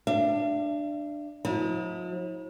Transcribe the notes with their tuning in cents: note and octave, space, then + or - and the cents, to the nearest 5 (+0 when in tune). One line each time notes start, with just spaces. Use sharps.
D4 +15 E5 +45
F3 +45 E4 -45